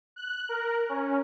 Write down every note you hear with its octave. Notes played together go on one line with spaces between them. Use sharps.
F#6
A#4
C#4